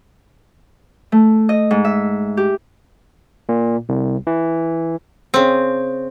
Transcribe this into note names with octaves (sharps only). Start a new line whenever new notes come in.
A3
D#5
G#2
E5
G4
A#2
C2
E3
C#3 C4